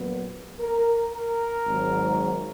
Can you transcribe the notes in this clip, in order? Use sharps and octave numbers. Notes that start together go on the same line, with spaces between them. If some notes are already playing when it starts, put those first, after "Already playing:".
Already playing: A#1 A#2 F#3 B3
A#4
A#4
G#1 G#2 F#3